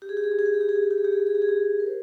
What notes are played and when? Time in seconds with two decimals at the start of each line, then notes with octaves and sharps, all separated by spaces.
0.02 G4
0.09 G#4
0.17 G4
0.24 G#4
0.32 G4
0.39 G#4
0.46 G4
0.54 G#4
0.61 G4
0.69 G#4
0.76 G4
0.83 G#4
0.91 G4
0.98 G#4
1.05 G4
1.12 G#4
1.20 G4
1.27 G#4
1.35 G4
1.42 G#4
1.49 G4
1.80 A#4
1.87 C5